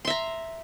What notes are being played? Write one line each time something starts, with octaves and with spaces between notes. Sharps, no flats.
E5 A#5 C6